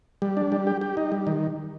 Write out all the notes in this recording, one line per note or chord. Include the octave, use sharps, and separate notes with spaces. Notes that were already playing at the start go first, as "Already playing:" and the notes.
G3
D4
G3
G4
G4
D#4
G3
D#3